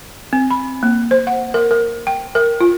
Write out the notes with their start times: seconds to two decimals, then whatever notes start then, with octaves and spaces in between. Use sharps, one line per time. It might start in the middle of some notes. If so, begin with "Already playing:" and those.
0.33 C4
0.51 B5
0.83 A#3
1.11 C5
1.27 F#5
1.54 A#4
1.71 A#4
2.07 G5
2.35 A#4
2.61 F4